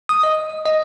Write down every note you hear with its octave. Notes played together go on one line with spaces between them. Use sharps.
D#6
D#5
D#5